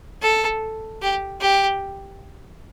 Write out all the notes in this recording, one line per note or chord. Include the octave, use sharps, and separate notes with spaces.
A4
G4
G4